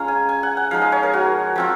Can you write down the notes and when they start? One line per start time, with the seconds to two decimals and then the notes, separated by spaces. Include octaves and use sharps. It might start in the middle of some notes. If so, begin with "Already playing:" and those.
Already playing: G#3 C#4 F4 A#5
0.08 G#5
0.29 G#5
0.43 F#5
0.57 F#5
0.71 F3 G#3 D#4 F5
0.82 D#5
0.92 C#5
1.03 A#4
1.13 F#4
1.56 F3 C4 F4